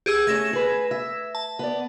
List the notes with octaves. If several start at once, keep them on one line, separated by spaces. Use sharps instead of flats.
G4 G#4 E6
A3 C#4 G#6 A#6 E7
G#4 B4
E5
A5
B3 D5